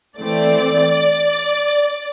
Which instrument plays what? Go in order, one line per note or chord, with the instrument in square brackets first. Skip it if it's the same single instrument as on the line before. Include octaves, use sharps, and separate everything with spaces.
[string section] E3 A3 C4 D5